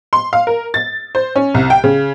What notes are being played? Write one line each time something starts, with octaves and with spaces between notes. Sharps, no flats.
C6
F5
A#4
A6
C5
C#4
C2
G5
C#3